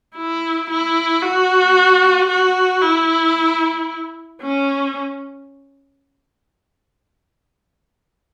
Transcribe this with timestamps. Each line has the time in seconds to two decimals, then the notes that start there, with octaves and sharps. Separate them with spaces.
0.17 E4
0.70 E4
1.22 F#4
2.29 F#4
2.82 E4
4.42 C#4